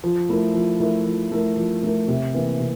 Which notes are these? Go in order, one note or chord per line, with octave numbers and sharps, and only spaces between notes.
F3
A3 E4 A#4
F3
A3 E4 A#4
F3
A3 E4 A#4
F3
A3 E4 A#4
C3
E3 A#3
C3